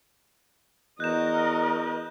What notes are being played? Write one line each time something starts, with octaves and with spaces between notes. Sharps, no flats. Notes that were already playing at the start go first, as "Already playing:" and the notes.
E2 F#4 A#4 D#5 F#6 G6 E7